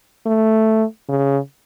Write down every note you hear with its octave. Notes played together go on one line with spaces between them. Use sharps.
A3
C#3